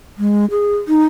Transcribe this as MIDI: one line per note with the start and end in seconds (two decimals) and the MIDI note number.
0.18 0.46 56
0.51 0.77 68
0.88 1.05 63